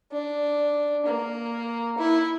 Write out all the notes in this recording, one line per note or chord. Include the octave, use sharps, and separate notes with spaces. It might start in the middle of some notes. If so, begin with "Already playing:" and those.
D4
A#3
E4